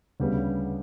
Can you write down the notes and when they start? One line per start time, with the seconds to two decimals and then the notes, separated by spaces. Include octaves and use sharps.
0.20 D2 C#3 G3 B3